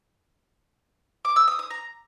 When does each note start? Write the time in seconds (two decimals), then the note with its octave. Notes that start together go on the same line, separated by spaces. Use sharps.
1.25 D6
1.36 E6
1.48 D#6
1.59 D#6
1.70 A#5